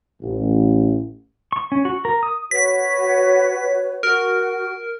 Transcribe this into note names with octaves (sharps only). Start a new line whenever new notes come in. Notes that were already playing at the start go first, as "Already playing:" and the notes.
A1
C#6
C#4
F#4
A#4
D#6
F#4 B4 C#5 B6
F#4 A#4